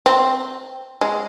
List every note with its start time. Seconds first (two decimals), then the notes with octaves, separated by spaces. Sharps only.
0.06 C4
1.01 G#3